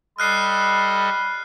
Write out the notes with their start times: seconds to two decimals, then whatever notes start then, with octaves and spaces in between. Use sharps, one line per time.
0.19 G3 A4 D#5 B5 F6 F#6 C7